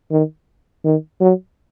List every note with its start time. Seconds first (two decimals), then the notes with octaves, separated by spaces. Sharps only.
0.11 D#3
0.85 D#3
1.21 F#3